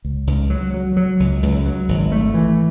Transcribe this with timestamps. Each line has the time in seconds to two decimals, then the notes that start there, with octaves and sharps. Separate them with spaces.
0.05 C#2
0.27 C#2
0.50 F#3
0.74 F#3
0.97 F#3
1.20 C#2
1.43 C#2
1.66 F#3
1.89 G#1
2.12 A3
2.34 E3